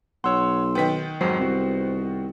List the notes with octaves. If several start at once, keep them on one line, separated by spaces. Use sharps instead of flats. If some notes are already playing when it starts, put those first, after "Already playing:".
B1 C#5 F#5 C6 E6
D#3 B3 G5 B6
F2 G#2 F#3 C5 C7
C2 C4 F#4